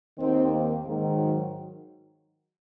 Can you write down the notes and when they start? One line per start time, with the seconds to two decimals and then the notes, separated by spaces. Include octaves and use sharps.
0.18 D#2 D#3 C4
0.50 A#3
0.82 G#2 D#3
1.14 F#3